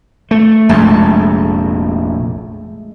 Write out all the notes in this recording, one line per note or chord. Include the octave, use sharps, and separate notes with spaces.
A3
F1 A#1 F2 G#3 A3 A5